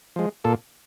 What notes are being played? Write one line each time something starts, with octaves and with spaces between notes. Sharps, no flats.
F3 G#3
A#2 A4